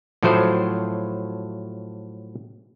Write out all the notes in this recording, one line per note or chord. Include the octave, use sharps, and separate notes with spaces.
A2 F3 F#3 A3 C5